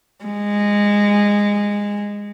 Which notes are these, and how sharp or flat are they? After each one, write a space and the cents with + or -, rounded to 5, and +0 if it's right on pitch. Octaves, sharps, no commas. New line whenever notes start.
G#3 -15